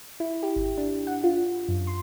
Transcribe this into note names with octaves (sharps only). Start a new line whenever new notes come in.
E4
G4
G#1
D4
F#5
F4
F#2
C6